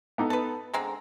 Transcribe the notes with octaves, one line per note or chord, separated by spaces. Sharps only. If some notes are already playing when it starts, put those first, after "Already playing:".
B3 D#4 A4
B4 A5
D3 G#3 C4 A#5